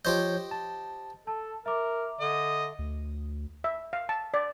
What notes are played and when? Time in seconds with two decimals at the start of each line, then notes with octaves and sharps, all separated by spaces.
0.05 F3 G4 C5 C#5 D#5 G6
0.51 A5
1.27 A4 A5
1.66 A#4 E5 D6
2.21 D3 D#5
2.79 D2
3.64 E5
3.93 F5
4.09 A5
4.34 D5